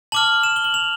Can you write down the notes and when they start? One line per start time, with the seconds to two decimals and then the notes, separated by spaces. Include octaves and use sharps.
0.12 A5 D6 F6 F#7
0.43 E7
0.56 G7
0.64 F#7
0.74 F7